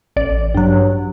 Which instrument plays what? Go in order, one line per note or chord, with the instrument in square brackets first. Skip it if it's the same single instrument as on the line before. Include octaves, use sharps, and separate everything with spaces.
[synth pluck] A1 D5
G2 F#3